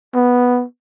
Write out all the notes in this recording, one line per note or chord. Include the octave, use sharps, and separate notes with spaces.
B3